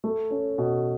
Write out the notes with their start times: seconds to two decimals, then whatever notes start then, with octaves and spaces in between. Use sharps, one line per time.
0.04 A3
0.31 C#4
0.58 B2